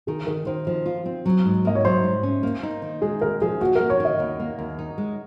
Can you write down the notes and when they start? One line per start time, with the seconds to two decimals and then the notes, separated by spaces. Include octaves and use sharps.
0.07 D#3 G#4
0.27 D#3 A#4
0.47 D#3 C5
0.67 F3 C5
0.86 F4
1.06 C4
1.26 F#3
1.46 G#2
1.65 A#3 D#5
1.75 C#5
1.85 F#3 C5
2.04 G#2
2.23 C#4
2.43 A#3
2.63 D#4
2.82 D#3
3.02 G#3 G#4
3.22 D#2 A#4
3.42 F3 G#4
3.60 A#3 F#4
3.76 A#3 A#4
3.90 C#5
4.00 D#3
4.05 D#5
4.20 D#2
4.40 A#3
4.59 D#2
4.79 D#4
4.98 G#3